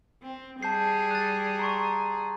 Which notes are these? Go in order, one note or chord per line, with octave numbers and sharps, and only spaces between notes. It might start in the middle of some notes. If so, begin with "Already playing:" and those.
C4
G3 G#4 A5 G6 C7
F#6 A6
A#5 C6 C#6